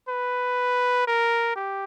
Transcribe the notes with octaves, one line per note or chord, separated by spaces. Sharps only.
B4
A#4
G4